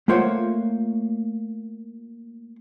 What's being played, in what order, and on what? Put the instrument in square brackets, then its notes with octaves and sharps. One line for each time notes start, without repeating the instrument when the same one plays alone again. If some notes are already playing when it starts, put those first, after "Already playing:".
[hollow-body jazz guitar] A3 A#3 F4 C5 C#5 F#5